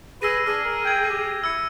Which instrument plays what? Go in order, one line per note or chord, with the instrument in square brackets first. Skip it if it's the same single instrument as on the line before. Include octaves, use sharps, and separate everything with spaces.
[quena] G#4 [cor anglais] B4 [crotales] E6 A#6 D#7
[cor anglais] D4 [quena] G#4 [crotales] F6
[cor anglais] A#4
[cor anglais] G5 [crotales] G#6 D#7
[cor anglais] G4
[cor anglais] E4 [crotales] E6 G#6 C#7